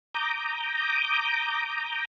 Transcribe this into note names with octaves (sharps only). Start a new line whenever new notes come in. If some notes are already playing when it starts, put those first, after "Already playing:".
A#5 D6 D#6 G6